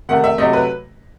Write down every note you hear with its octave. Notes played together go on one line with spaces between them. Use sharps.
C3 D#3 A3 F#5
E5
C3 F#3 A3 D#5
B4